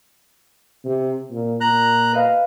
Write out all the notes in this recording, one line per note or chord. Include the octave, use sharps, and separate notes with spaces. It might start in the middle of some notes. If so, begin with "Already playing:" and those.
C3
A#2
A#2 A#5 F#6
B4 D#5 F5